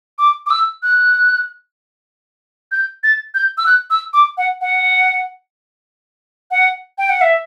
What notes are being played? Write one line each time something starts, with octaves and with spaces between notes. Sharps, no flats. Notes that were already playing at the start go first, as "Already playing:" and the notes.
D6
D6
E6
F#6
G6
A6
G6
E6
F#6
E6
D6
F#5
F#5
F#5
G5
F#5
E5